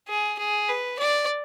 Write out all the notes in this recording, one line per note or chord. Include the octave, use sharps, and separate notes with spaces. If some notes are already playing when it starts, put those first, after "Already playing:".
G#4
G#4
B4
D5